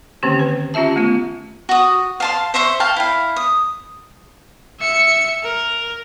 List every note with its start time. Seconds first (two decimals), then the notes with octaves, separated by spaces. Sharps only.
0.23 D3 D#3 A#3 C4 C#4 G4
0.39 B4
0.74 C#4 F4 G4 E5 A5
0.96 A3 B3 F4
1.69 F#4 D#6
2.20 F5 A5 C6
2.54 C5 E5 C6 C#6
2.80 F5 G5 A5
2.96 E4 F5
3.36 D#6
4.80 E5 C#7
5.43 A#4